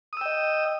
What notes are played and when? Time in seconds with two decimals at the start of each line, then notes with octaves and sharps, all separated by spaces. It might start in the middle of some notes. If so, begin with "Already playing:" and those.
0.13 D#6
0.17 E6
0.21 G5
0.26 D#5